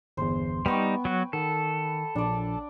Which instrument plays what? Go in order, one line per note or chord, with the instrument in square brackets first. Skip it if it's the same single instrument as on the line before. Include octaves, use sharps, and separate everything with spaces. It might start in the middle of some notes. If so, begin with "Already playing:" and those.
[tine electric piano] G1 E2 [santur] C5
[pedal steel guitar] G3 D#4 [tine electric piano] B3 [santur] B4 G5 C#6
[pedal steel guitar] F#3 F#4
[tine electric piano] D#3 [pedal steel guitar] A4 [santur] F#5
[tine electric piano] A#1 [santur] D4 D5